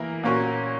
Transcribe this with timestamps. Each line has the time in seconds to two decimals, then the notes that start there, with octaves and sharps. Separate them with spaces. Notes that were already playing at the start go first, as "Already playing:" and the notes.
Already playing: E3 A#3 E4 A#4
0.23 A#2 A#3 C#4 F#4 A#4